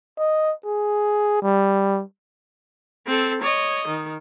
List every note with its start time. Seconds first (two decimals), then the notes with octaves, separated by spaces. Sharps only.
0.18 D#5
0.65 G#4
1.42 G3
3.06 C4 A4
3.42 C#5 D#5
3.88 D#3